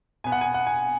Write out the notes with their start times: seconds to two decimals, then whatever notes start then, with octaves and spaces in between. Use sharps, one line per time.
0.24 B2 B3 G#5
0.32 F#5
0.41 G#5
0.54 F#5
0.67 G#5